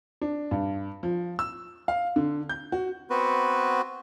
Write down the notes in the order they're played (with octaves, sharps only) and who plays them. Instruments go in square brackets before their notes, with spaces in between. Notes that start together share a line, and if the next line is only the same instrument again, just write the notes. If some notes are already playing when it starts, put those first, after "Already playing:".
[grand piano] D4
G2
F3
E6
F5
D3
G6
F#4
[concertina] B3 C4 F#4 B4